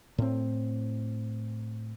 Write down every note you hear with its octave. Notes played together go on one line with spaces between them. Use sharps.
A2 C4